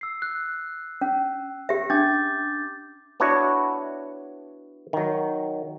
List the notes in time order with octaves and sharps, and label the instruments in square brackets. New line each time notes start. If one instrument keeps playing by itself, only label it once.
[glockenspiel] E6 C7
F#6
[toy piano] C#4
G4 E5
[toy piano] C#4 D4 [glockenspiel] D6 G6 A6
[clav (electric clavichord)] B3 D4 E4 F#4 C#5
D#3 F#3